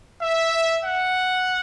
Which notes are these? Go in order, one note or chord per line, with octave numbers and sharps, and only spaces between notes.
E5
F#5